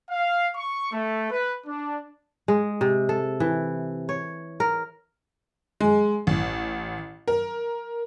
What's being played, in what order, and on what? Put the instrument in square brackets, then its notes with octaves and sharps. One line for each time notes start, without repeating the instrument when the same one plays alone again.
[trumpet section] F5
C#6
A3
B4
D4
[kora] G#3
C3
A4
E3
C#5
A#4
[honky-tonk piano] G#3
A1
A#4